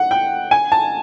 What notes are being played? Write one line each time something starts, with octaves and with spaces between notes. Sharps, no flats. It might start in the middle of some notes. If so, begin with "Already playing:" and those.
Already playing: F#5
G5
G#5
A5